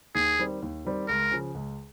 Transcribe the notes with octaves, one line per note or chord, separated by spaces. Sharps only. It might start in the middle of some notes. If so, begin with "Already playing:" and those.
D#2 G#4
D#3 G3 C4
D#2
D#3 G3 C4
C#2 A#4
C#3 F3
C#2